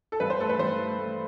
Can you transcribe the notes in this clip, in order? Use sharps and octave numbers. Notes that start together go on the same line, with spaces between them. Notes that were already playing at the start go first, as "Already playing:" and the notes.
A4
G2 B4
C5
A3 A4
B4
G2 C5
A3
A3